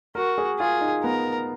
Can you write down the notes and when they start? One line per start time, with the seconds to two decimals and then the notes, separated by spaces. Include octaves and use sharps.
0.15 F#4 A#4
0.38 G#4
0.59 F4 G#4
0.81 D#4
1.03 B3 A#4